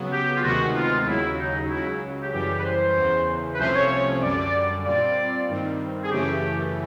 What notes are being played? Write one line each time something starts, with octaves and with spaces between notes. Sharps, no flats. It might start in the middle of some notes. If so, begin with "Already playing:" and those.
Already playing: C#3 F#3 B3
G4
F4
D2 C3 D#3 G#3 B3 F#4
F4
D#2 C#3 F#3 E4
D#4
C#2 C#3 F#3 E4
G4
F#2 C#3 E3 G3 G4
B4
C5
E2 C#3 E3
B4
C2 C3 F3 A3 C#4 C5
C#5
F#2 D3 G3 D5
A#2 G3 C4 F4 D5
G2 D#3 G3 C4
G#4
F#2 C#3 E3 A3 G4